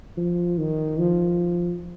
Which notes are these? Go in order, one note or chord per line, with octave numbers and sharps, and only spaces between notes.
F3
D#3
F3